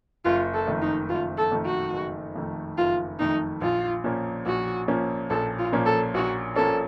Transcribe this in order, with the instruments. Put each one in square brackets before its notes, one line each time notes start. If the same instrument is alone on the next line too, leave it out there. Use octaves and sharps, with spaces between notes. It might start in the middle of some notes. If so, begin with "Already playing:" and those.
[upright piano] F#1 [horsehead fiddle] F4
[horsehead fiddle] A4
[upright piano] F2 D#3 A3
[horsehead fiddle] D#4
[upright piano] F#1 [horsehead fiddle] F4
[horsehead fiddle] A4
[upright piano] F2 D#3 A3
[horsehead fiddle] F#4
[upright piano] F#1
F2 D#3 A3
[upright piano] F#1 [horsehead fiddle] F4
[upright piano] F2 D#3 A3 [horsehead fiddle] D#4
[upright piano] A#1 [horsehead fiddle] F4
[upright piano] A#2 F3 A#3 C#4
[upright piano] A#1 [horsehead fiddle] F#4
[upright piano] A#2 F3 A#3 C#4
[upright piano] A#1 [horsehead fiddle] A4
[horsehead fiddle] F4
[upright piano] A#2 F3 A#3 C#4
[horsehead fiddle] A4
[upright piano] A#1 [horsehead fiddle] F#4
[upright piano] A#2 F3 A#3 C#4 [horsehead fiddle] A4